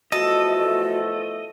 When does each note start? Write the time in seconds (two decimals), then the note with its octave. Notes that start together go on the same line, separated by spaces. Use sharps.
0.12 E2 F3 A3 F#4 A4 D#5